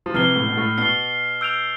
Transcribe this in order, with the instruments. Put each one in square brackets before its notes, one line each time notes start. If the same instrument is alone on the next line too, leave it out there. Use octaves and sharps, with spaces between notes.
[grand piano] F3
[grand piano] C3 E3 [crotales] F6 C7 G7
[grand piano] A2
B2
A2
[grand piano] B2 [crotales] F6 C7 G7
[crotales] E6 G6 D7 F7